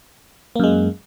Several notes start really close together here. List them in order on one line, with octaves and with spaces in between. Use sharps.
A#3 F#2 G#3